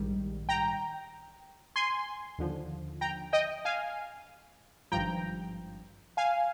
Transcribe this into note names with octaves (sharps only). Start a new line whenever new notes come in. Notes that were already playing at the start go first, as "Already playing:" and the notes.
Already playing: A#1 G#2 D#3 G3
G5 A#5
G#5 C6
D#2 D3 F3
G5 A#5
D#5 G5
F5 G#5
G#1 G2 F3 G5 A#5
F5 G#5